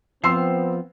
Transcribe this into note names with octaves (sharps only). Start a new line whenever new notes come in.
F3 B3 C4 C6 E6 C7